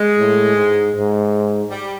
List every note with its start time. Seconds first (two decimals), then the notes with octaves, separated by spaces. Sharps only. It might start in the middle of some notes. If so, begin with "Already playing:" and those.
Already playing: G#3
0.18 A2
0.56 G#2
0.95 G#2
1.70 G3